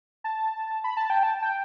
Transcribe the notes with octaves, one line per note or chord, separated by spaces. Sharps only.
A5
B5
A5
G5
A5
G5